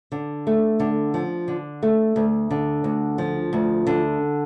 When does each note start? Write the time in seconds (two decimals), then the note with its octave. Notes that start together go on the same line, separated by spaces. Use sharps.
0.12 D3
0.47 A3
0.80 D3
1.14 F3
1.48 D3
1.83 A3
2.16 D2
2.51 D3
2.84 D2
3.18 F3
3.53 D2
3.87 D3